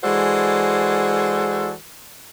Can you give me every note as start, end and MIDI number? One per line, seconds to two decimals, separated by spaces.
0.04 1.72 52
0.04 1.72 56
0.04 1.72 66
0.04 1.72 69
0.04 1.72 72
0.04 1.72 74